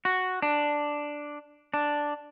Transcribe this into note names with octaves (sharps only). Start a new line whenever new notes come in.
F#4
D4
D4